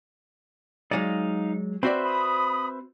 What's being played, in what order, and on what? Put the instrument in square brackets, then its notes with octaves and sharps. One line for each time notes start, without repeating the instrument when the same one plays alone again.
[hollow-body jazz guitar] F#3 G#3 D5 [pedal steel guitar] D#4 F5
[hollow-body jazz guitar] C4 F#4 D5 [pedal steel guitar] B4 C5 E5
[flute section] B5 D#6